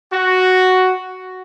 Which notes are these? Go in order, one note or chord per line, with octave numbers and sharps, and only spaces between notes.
F#4